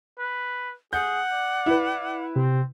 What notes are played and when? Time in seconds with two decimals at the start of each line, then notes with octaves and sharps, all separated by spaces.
0.19 B4
0.93 G#4 F#5 G6
1.32 D5
1.66 E4 B4
2.36 C3 C4